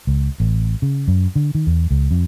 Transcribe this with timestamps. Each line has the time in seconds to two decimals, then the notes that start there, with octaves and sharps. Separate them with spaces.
0.07 C#2
0.40 A1
0.82 C#3
1.08 F#2
1.36 D3
1.55 D#3
1.67 E2
1.91 C#2
2.11 F2